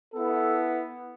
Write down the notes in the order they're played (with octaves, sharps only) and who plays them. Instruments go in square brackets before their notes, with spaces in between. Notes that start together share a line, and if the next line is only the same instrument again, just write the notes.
[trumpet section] B3 E4 A4